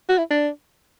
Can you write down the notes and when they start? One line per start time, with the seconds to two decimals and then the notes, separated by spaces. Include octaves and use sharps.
0.09 F#4
0.18 E4
0.30 D4